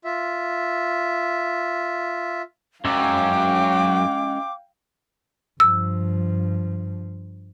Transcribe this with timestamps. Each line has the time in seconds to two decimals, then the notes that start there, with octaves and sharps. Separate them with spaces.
0.04 F4 E5
2.85 F#2 F#3 G#3 C#4 F5 G5 D6 E6
5.60 G2 F3 E6